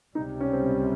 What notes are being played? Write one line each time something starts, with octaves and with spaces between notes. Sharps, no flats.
C#2 C3 G3 D#4
C#4
C4